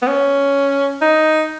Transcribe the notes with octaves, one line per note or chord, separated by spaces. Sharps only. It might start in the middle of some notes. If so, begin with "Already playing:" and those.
B3
C#4
D#4